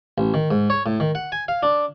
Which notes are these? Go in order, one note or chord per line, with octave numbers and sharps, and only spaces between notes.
A1
D#3
G#2
C#5
A2
D#3
F#5
G#5
F5
D4